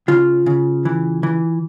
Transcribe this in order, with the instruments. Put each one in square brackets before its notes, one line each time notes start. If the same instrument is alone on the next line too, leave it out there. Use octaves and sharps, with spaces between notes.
[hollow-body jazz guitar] C#3 F4
C#3
E3
E3